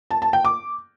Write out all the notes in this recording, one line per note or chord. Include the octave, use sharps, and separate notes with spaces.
A5
A5
G5
D6